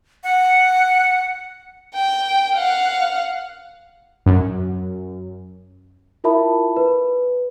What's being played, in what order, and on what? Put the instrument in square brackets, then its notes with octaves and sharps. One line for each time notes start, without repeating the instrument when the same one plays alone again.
[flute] F#5
[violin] G5
F5 F#5
[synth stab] F#2
[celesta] E4 F4 A#4 E5 A5 B5
B4